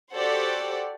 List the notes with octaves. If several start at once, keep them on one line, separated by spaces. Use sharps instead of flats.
F#4 G4 A4 C5 D5 F#5